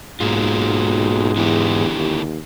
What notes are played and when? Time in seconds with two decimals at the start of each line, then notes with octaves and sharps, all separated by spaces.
0.20 B1 G#2 F#3 A#3 F4
1.36 E2 D3 E4 G4
1.95 D#2